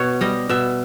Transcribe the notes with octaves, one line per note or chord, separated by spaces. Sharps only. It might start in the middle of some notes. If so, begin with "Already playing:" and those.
Already playing: B2 C#5
G3 D#5
B2 E5